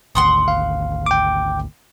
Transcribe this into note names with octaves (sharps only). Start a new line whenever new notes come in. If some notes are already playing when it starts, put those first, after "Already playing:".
G#1 D2 F#5 C6 D#6
F5
G5 D6